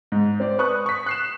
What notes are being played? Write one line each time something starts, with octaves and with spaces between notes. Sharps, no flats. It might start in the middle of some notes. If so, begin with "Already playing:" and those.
G#2
C4 D5
B4 C#6 D#6 F#6
C#6 B6
F#6 C7 E7